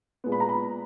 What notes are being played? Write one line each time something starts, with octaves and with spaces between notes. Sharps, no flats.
A#2 G#3 B3
B5
A#5
B5